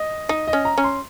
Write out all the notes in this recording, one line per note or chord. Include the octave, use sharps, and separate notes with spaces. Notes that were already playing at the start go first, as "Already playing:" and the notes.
Already playing: D#5
D#4 D#5
D#5
C#4
A#5
C#4
C6